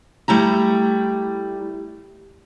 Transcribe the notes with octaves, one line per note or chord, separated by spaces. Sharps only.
G3 A3 E4 A#5